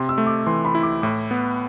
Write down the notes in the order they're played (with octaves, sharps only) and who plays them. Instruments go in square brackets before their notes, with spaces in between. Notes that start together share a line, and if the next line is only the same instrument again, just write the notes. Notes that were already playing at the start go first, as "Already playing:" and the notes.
Already playing: [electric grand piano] C3 [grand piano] C6
[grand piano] E6
[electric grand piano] A3
[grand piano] D6
[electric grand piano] E3 [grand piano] C6
[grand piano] B5
[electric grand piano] E4
[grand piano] D6
[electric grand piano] A2 [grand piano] D6
[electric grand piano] B3